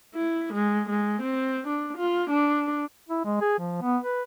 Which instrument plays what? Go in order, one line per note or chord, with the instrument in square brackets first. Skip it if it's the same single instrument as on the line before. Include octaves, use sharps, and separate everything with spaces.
[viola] E4
G#3
G#3
C4
D4
F4
D4
[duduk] E4
G#3
G#4
F3
B3
B4